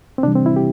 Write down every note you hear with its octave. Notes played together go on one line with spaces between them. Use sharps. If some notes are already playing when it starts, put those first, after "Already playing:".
C4
C3 E3 G3 D4
C4
E4
G4